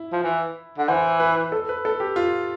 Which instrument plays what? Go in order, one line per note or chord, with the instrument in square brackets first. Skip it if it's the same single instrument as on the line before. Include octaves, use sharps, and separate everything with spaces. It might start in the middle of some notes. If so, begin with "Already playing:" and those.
Already playing: [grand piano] E4
[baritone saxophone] F3
E3
D3
[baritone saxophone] E3 [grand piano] C5
[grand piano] B4
A4
B4
A4
G4
F4